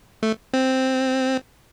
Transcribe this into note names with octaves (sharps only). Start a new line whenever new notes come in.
A3
C4